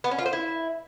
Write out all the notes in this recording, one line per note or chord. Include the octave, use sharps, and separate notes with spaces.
B3
C#4
F4
C5
E4